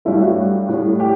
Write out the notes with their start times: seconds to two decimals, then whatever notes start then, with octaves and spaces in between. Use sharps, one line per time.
0.05 G2 F#3 A3 E4
0.21 F#4
0.68 A2 G3
1.00 G4